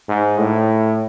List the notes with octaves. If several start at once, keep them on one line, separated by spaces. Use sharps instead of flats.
G#2
A2